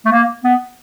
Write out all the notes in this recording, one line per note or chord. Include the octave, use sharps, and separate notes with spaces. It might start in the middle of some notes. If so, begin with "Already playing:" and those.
A3
A#3
B3